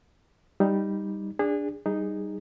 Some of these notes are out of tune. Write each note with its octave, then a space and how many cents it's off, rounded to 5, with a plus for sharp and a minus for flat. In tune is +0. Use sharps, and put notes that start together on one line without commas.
G3 +5 D#4 +0
D4 +0 G#4 -25
G3 -10 D#4 -5 G#4 -15